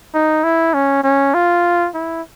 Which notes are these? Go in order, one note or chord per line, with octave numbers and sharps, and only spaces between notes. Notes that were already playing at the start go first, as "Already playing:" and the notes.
D#4
E4
C#4
C#4
F4
E4